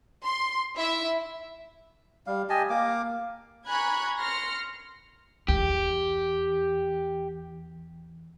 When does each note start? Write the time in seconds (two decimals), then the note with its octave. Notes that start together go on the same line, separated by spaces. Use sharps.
0.23 C6
0.75 E4 E5
2.27 G3 F5
2.49 G4 D#5 G#5 A5
2.70 A#3 F5 D6
3.67 G#5 A#5 B5 C#6 F#6 G#6
4.18 C6 F6 A#6 C#7
5.48 E2 G4